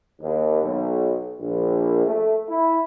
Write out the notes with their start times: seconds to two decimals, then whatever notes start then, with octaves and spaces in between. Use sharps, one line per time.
0.21 D#2
0.64 B1
1.40 A#1
2.06 A3
2.49 E4